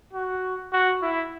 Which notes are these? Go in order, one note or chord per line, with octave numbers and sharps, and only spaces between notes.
F#4
F#4
E4